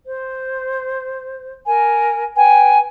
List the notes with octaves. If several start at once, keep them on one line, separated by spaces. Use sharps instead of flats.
C5
A#4 G#5
B4 G5 G#5